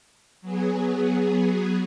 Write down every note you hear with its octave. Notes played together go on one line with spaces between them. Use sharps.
F#3 B3 G#4